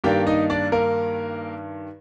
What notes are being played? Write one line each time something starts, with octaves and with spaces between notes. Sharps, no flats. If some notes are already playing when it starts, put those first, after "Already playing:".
G2 D#3 A#3 D4 G4 G5
D#4 D#5
D4 D5
A#3 A#4